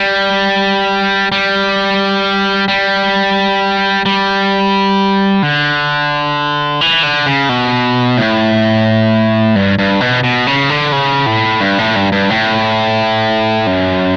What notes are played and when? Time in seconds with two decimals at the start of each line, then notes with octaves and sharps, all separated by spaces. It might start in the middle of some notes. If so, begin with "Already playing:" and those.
Already playing: G3
1.32 G3
2.68 G3
4.06 G3
5.43 D3
6.81 E3
7.03 D3
7.26 C#3
7.49 B2
8.17 A2
9.56 G2
9.79 G2
10.01 B2
10.24 B2
10.47 C#3
10.70 D3
10.92 C#3
11.26 A2
11.60 G2
11.78 A2
11.96 G2
12.12 G2
12.30 A2
13.67 F#2